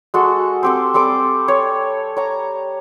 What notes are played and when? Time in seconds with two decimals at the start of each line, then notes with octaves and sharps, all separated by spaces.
0.14 G#3 F#4 A4
0.63 C4 G4 A4
0.94 G3 C4 A4 D6
1.48 C#5
2.17 C#5 A#5